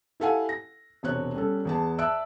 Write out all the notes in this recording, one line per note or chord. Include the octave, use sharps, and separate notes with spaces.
E4 G4 A4 F5 F#5 G#5
A#6
E1 C3 C4 C#5 F#6
G3 C#4 A4
E2 G#4 A5
D5 E5 A5 E6 F#6 D7